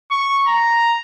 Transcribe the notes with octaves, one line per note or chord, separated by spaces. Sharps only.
C#6
A#5